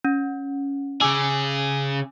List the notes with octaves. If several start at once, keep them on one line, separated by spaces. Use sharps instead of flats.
C#4
C#3 G#4 G#5 D6 E6